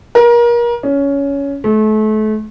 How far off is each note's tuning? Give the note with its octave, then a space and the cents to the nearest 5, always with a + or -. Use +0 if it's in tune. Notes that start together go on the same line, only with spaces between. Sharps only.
A#4 +30
C#4 +15
A3 -35